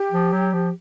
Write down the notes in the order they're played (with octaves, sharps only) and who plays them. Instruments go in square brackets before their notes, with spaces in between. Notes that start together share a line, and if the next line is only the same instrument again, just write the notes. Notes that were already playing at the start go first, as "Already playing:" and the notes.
Already playing: [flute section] G4
[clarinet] F3
F#3
F3